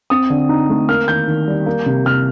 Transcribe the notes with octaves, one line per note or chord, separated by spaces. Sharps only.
C4 D#6
D3
D#4
A3
A#3 F6
D#3 G6
D#3
G3
A#3
C3
C3 F6